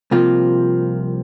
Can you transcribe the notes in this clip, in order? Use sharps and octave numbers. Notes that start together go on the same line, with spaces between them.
C2 C3 F3 A#3 F4